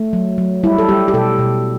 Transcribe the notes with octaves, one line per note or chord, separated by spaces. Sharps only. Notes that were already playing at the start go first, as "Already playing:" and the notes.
Already playing: A3
F#3
F#3
G3 E4
A4
G3 G4
G4
B2 A4
B2